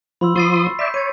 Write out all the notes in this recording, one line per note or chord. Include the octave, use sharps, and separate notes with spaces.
F3 B5 C6 E6
F3 C6 C#6 D#6 A6 C7
D5 E5 G6 B6
C#5 A6 D#7